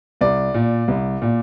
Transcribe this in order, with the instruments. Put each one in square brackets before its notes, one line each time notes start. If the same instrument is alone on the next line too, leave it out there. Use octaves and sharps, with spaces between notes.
[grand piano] C2 D5
A#2
C2
A#2